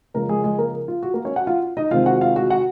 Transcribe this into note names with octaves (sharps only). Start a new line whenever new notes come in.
C#3 F3 G#3 A#3 A#4
G#3 G#4
G#3 G#4
A#3 A#4
F4
F#4
A#3 A#4
C#4 C#5
F#4 F#5
F4 F5
D#4 D#5
C3 D#3 G#3 C4 F4 F5
F#4 F#5
F4 F5
F#4 F#5
F#4 F#5